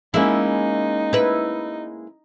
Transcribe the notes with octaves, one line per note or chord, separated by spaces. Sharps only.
G#3 A#3 C#4 D#4 E4
E4 B4